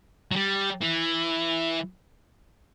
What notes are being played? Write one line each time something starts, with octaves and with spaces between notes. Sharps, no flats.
F#3
G3
E3